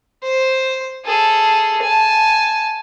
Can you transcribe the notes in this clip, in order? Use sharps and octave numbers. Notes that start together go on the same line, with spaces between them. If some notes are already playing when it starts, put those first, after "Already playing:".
C5
G#4 A4
G#5 A5